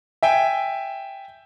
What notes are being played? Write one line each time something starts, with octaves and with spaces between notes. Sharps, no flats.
E5 G5 G#5